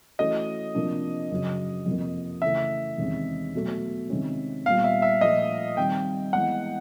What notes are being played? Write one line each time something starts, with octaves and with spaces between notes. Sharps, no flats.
E3 A3 C#4 F#4 D#5
C3 F3 A#3 D4
F#2 C#3 F#3
F2 C3 F3 A#3
C#3 E3 A3 E5
E2 C3 D#3 G#3 C#4
B2 F#3 A3
C3 D#3 G#3 C#4
A#2 G3 B3 F5
E5
E5
A#2 F3 A3 D#5
D#3 G3 C4 G5
E3 G#3 B3 F#5